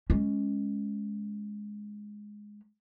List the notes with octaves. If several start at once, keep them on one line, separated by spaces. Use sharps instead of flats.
G#3 C#4